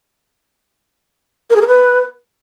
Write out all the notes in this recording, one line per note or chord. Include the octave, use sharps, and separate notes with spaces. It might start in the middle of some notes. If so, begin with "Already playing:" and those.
A#4
G#4
A#4
B4